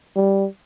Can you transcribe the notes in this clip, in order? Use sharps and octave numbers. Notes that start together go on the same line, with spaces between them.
G3